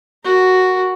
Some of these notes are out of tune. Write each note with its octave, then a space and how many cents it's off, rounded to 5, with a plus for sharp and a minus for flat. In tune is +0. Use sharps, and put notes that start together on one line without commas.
F#4 +0 A#4 +0